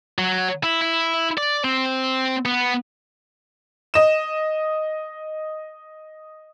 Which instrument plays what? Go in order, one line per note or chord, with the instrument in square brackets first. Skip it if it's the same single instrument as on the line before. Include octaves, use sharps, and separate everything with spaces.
[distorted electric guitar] F#3
E4
E4
D5
C4
B3
[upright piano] D#5 E7